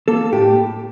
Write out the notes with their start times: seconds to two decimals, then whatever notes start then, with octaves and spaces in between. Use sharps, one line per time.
0.08 A#3 A4
0.32 A2 G4